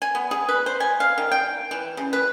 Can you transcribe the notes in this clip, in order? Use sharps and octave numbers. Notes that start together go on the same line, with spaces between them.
G#5
B3
G#4
B4
C5
G#5
F5
D#3
G5
E3
C#3
B4